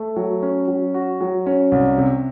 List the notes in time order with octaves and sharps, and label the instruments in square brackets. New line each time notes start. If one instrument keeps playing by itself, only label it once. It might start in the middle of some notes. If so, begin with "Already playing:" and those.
Already playing: [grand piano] A3
F#3
C#4
F#3
F#4
F#3
C#4
C2
C3